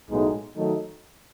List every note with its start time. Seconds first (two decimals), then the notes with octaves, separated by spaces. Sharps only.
0.10 B1 A2 G#3 B3 D#4
0.56 D#3 F#3 A3 D#4